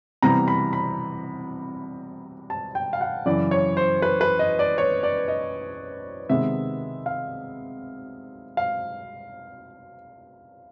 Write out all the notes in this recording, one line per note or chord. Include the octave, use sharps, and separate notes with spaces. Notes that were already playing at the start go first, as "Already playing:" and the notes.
C3 E3 G3 B3 A#5
B5
B5
A5
G5
F5
F#5
F#2 C#3 E3 D5
C#5
C5
B4
B4
D#5
D5
C#5
D5
D#5
C3 D#3 G#3 B3 E5
F5
F5